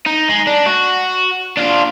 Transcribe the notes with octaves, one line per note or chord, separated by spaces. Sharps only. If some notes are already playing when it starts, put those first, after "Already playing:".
D#4
G#3
D4
F#4
D4 F4